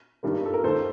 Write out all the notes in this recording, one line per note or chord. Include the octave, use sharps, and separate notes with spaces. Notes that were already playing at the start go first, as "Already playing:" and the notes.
G2 D#3 G3 A#3
A4
A#4
D#2 D#3 A#3 A4 C5